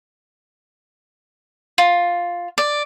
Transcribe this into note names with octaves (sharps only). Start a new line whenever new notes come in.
F4
D5